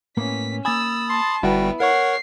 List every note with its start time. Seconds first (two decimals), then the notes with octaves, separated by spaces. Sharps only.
0.17 A2 A#3 B3 C#4 B6
0.65 A#3 G#5 B5 D#6 E6 A6
1.10 A5 C6
1.43 G1 G3 B3 E4 F#4 G5
1.80 A#4 C#5 F#5 C#6 C7